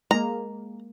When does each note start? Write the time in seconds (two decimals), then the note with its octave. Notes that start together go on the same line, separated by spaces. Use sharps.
0.11 G#3 A#3 A#5